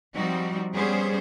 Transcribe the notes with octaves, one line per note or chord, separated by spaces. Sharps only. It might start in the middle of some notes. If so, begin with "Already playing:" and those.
F3 G3 C4 D#4 F#4
G3 B3 C#4 G#4 C5